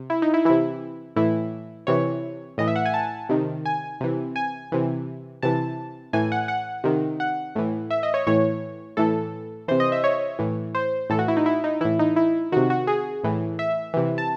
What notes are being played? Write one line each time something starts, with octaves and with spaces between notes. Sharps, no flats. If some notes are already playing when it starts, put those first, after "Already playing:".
Already playing: C3
E4
D#4
E4
C3 E3 E4
A2 E3 E4
C3 E3 C#5
A2 E3 D#5
E5
F#5
G#5
A5
C3 D#3
G#5
C3 E3
G#5
C3 E3
C3 E3 A5
A2 E3 G#5
F#5
F#5
C3 D#3
F#5
A2 E3
E5
D#5
C#5
A2 E3 C#5
A2 E3 A4
C3 E3 C5
D#5
E5
C#5
A2 E3
C5
A2 E3 A4
F#4
E4
D#4
E4
D#4
A2 E3 E4
D#4
E4
C3 D#3 F#4
F#4
G#4
A2 E3
E5
C3 E3
A5